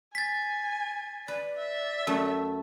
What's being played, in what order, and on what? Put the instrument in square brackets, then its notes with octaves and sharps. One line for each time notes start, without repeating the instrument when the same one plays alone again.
[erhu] G#5 [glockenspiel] A6 B6
[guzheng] B4 [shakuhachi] D5
[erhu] E5
[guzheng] F#2 A3